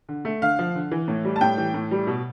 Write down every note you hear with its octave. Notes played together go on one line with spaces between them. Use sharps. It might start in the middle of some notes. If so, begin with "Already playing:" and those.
D3
A3
D3 F5
F3
D3
E3
A2
G3
A5
A2 G5
E3
A2
G3
B2